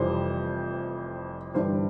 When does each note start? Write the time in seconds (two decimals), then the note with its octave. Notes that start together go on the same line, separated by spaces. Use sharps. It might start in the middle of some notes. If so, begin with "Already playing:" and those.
Already playing: F1 F2 E3 G3 C5
1.54 G1 G2 E3 G3 D4 C5